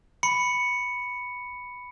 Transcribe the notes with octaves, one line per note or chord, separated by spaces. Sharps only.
B5 C#7